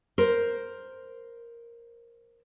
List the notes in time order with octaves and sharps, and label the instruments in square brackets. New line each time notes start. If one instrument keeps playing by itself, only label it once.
[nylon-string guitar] A#4 C5